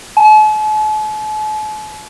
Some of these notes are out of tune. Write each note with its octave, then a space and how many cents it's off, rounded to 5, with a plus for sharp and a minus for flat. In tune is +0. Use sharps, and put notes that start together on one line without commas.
A5 -45